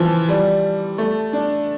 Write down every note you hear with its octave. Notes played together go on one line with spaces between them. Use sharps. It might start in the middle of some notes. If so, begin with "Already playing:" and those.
Already playing: E3 F3
G3
A3
D4